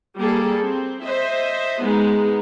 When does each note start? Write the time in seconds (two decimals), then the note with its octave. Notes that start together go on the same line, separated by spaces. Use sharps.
0.18 G3 A#3 G#4 A4
0.61 C4
1.05 C5 D#5 E5
1.82 G#3 B3 D#4 G#4